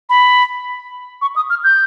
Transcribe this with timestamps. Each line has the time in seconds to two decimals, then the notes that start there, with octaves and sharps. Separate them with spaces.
0.10 B5
1.22 C#6
1.36 D#6
1.50 F6
1.64 G6